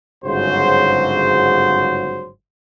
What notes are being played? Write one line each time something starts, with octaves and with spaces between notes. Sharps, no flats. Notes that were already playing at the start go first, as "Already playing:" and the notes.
G1 G#2 C#3 F#3 F#4 C5